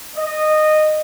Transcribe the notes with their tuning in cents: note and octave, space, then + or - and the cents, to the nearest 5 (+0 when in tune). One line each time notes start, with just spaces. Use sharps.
D#5 -15